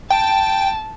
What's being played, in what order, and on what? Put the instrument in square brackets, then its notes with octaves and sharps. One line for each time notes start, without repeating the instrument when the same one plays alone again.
[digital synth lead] G5 [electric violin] A5